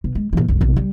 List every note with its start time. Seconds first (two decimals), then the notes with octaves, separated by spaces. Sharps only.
0.04 B2
0.15 G#3
0.33 A#2 E3
0.48 F1 C2
0.61 A#1 C3
0.77 G3